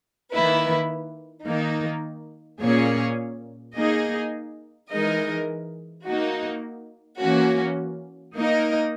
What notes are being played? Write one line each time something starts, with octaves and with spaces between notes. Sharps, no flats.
D#3 A#3 E4 B4
D#3 A#3 D#4
A#2 A#3 C#4 G#4 C#5
A#3 D#4 G#4 D#5
E3 G#3 D#4 A#4 D#5
A#3 D#4 F#4
E3 A#3 C#4 F#4
A#3 D#4 A#4 D#5